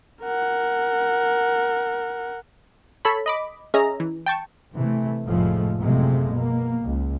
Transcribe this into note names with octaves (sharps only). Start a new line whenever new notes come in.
A#4 F#5
A4 C#5 B5
D#5 B5 D6
C#4 G#4 D#5 E5 A#5
E3
G5 A5 C#6
C3 E3 A3
F1 A2 F3 G#3 A3
F#1 C3 F3 G#3 A3
B2 A#3
C#2